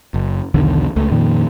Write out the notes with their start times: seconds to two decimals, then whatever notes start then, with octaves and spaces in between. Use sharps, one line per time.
0.14 F#1
0.54 B1 E2 D3 D#3
0.96 C#2 A3
1.12 F2 A#2 D#3